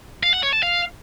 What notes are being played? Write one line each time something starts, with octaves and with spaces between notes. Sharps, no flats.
F5
F#5
C#5
A5
F5